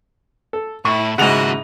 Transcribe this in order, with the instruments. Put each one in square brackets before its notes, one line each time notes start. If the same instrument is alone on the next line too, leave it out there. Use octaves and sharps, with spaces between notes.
[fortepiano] A4
[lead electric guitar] A2 [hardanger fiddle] E4 [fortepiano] C#6
[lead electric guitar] D#2 F#4 [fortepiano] G#2 F#5 [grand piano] C#3 F7 [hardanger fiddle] E4 D#5